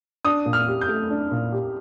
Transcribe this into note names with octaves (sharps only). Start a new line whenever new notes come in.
D4 D#6
A#2
F6
G4
G6
A3
D4
A#2
G4